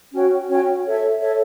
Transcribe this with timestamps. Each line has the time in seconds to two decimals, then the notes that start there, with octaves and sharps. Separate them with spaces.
0.13 C#4 F#4 C#5 G5
0.48 C#4 F#4 C#5 G5
0.84 A4 C#5 E5
1.19 A4 C#5 E5